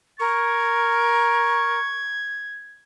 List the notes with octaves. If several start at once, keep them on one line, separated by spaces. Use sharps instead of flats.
A#4 C#6 G#6